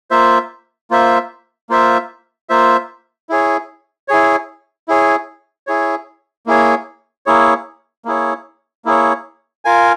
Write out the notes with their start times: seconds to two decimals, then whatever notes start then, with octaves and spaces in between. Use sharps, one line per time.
0.11 A#3 F4 C5 E5
0.91 A#3 F4 C5 E5
1.70 A#3 F4 C5 E5
2.49 A#3 F4 C5 E5
3.29 E4 G#4 C#5
4.08 E4 G#4 C#5
4.88 E4 G#4 C#5
5.67 E4 G#4 C#5
6.46 A#3 E4 G#4 C#5
7.26 A#3 E4 G#4 C#5
8.05 A#3 E4 G#4 C#5
8.85 A#3 E4 G#4 C#5
9.65 F4 A#4 F5 G#5